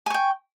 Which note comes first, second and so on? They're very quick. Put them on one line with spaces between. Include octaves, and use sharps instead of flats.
G#5 C#6 G5